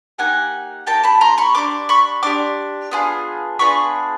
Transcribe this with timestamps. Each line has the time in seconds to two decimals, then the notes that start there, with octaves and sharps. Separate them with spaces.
0.18 A#3 D#4 G4 F#5 G#5
0.87 A#3 D#4 G4 G5 A5
1.04 A5 B5
1.21 A#5 C6
1.38 B5 C#6
1.55 D4 G4 C6 D6
1.89 B5 C#6
2.23 D4 G4 C6 D6
2.91 B3 D4 F4 G#4
3.59 B3 D4 F4 G#4 B5 C#6